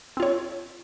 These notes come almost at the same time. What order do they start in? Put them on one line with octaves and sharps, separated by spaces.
C4 F4 C#5